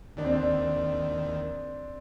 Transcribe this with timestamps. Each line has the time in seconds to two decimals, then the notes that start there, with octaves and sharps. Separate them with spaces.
0.17 D#2 D#3 D4
0.25 C4
0.32 D4